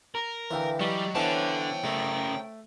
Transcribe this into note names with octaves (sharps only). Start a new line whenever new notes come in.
A#4
D2 E3 B4 F5 G5
E3 F#3 G3 G4 D#5 C#6
D3 E3 B3 C#4 C5 C#5 G5 A5
C#3 A3 A#4